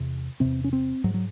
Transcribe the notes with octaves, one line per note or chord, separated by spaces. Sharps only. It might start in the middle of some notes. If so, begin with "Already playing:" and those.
Already playing: E2 C3
E2 C3 C4
C#4
C4
G#2 F#3
F#3